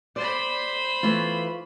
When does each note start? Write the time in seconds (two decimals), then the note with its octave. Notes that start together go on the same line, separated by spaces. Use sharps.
0.16 C5 D5 B5
1.03 E3 A3 F4